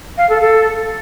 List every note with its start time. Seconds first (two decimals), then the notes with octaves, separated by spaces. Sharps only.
0.17 F5
0.29 A4
0.41 A4